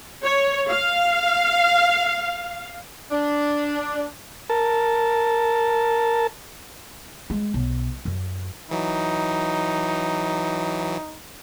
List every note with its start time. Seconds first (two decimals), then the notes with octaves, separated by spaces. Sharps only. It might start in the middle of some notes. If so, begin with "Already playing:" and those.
0.24 C#5
0.69 F5
3.10 D4
4.50 A#4 A5
7.30 G#3
7.54 B1
8.05 F#2
8.71 E3 F#3 D#4